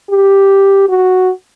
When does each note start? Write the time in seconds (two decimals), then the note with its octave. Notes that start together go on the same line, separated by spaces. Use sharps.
0.10 G4
0.89 F#4